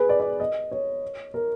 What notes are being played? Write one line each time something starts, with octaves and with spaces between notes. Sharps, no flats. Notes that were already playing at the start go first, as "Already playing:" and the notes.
Already playing: G#4 B4
D5
D5
D#5
C#5
A#4